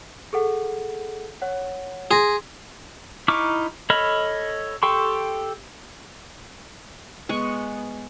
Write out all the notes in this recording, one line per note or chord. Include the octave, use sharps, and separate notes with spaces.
G#4 A4 F#5
C#5 F#5
G#4 C6 A#6
D#4 E4 C#6 D6 F6
A4 C#5 D#5 B5 F6
G4 A4 G5 C6 C#6
G#3 B3 C#6